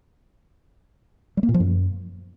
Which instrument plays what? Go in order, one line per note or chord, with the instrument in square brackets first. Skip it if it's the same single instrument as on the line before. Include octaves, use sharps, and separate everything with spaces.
[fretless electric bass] G3
A#3
A#2
F3
F#2